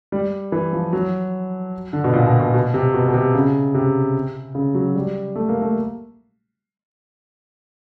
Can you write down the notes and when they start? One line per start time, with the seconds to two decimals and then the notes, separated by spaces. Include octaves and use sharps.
0.12 G3
0.52 E3
0.73 F3
0.93 F#3
1.93 D3
2.04 B2
2.13 A#2
2.27 B2
2.40 B2
2.54 B2
2.74 C3
2.94 B2
3.08 B2
3.14 C3
3.34 C#3
3.74 C3
4.55 C#3
4.75 F#3
4.95 G3
5.36 A3
5.49 A#3
5.62 A3